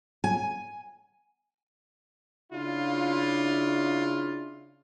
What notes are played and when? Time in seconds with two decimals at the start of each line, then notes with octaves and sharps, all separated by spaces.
0.24 G#5
2.52 C#3 D4 E4 F4